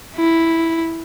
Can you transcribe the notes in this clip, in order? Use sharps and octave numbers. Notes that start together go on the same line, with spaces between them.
E4